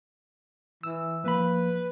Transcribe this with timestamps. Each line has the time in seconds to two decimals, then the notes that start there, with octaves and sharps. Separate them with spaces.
0.83 E3 E6
1.24 F3 A#3 B4 B5